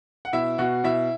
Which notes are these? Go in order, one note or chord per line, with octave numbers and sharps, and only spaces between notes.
F#5
B2 E4 E5
B2 F#4 F#5
B2 E4 E5